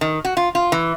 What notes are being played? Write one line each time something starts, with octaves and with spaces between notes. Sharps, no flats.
D#3
F#4
F4
F4
E3